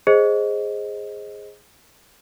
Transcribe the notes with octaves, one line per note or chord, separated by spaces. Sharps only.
G#4 C5 D#5